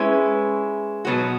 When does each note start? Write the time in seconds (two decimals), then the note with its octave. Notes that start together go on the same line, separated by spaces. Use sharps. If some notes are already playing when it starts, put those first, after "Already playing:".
Already playing: G#3 C#4 E4 B4
1.05 B2 F#3 B3 F#4